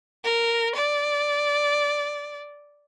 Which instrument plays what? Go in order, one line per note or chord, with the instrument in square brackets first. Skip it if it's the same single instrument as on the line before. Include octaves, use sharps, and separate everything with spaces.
[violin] A#4
D5